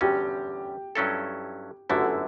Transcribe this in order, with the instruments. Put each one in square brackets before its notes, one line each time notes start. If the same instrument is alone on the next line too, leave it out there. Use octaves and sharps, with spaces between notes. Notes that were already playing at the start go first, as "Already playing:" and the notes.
[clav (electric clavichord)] E2 D3 G3 C#4 [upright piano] G4
[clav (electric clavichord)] G2 F#3 C#4 E4 A4
[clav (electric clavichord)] G1 F#2 D3 A3 E4 [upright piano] F#4